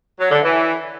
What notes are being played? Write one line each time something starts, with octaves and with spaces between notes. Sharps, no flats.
F#3
D3
E3